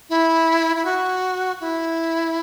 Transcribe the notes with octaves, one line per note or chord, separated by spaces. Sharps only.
E4
E4
F#4
E4